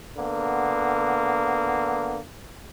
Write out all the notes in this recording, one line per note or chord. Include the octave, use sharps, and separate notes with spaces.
D3 A#3 B3